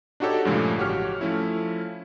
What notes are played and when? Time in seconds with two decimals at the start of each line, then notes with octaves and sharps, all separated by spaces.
0.20 D4 D#4 F#4 G4 A4 C#5
0.45 G2 A#2 C#3 F3 G#3 A3
0.77 A1 F#4 G4 C#5 F6
1.21 F3 A3 C#4 E4